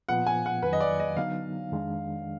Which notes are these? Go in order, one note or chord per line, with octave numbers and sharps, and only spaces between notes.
A#2 F3 B3 F4 F#5
G#5
F#5
F2 D#3 F#3 B4
D#5
D5
D#5
D3 F#3 B3 D#4 F5
F2 D#3 G#3 D4